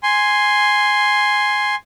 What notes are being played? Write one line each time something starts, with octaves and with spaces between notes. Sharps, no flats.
G#5 C6